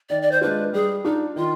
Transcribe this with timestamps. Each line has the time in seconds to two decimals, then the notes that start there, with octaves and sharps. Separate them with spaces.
0.09 D#3 D5
0.22 D5
0.32 C5
0.41 G#3 D4 F4 B4
0.73 G3 G#4
1.05 D4 D#4 F4
1.36 D#3 F4